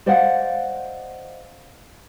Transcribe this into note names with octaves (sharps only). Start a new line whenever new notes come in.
C5 D5 D#5 F5 F#5